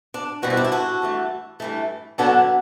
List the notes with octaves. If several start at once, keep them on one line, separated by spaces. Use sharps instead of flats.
D4
E2 B2 G3 C4 F#4
E4
D4
E4
F#4 A4
G2 E3 A3
G2 E3 A3
F#2 D3 F#3 B3 D4 F#4 A4